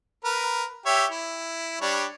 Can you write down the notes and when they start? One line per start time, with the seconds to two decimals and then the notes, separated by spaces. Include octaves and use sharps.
0.25 A#4 B4
0.86 G4 C#5 E5
1.11 E4
1.81 G3 D4 C#5